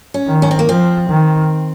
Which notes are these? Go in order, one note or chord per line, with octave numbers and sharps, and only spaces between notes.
C#4
D#3
C#4
C4
A#3
F3 C4
D#3